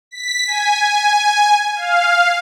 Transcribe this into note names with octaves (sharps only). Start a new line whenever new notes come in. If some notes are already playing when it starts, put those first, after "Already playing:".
B6
G#5
F5